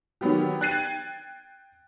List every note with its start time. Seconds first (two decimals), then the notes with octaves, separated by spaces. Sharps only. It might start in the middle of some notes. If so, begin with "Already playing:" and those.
0.21 D#3 F#3 B3 G4
0.60 G5 F#6 G#6 A6 C7 D#7